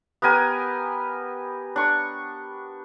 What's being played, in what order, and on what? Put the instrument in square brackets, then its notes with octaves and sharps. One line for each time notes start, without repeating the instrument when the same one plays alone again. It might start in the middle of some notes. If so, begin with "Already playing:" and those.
[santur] B3 G4 A#4 G#5
D4 C#6